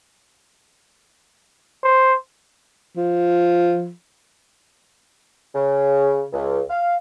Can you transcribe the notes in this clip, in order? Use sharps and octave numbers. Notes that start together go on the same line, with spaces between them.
C5
F3
C#3
C#2
F5